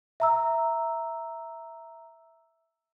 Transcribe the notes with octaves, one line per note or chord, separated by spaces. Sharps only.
E5 A#5 E6